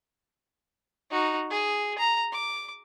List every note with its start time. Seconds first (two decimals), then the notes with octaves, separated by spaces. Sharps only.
1.10 D#4 F#4
1.50 G#4
1.98 A#5
2.32 D6